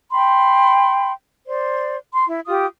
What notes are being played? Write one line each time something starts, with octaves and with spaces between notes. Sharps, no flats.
G5 B5 C6
C5 D5
C6
E4
F4 G4 D#6